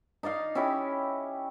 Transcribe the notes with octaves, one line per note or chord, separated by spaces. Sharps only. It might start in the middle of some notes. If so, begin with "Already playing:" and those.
D#4 D5 D#5 F5
C#4 E4 G4 D#5